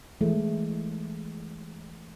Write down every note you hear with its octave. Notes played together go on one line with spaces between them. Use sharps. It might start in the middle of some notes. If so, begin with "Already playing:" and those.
E3 G#3 A3